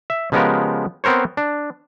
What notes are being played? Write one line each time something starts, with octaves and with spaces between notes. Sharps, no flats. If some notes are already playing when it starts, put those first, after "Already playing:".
E5
C#3 F3 G#3 B3 G4 A#4
B3 C4 A#4 C5 C#5
D4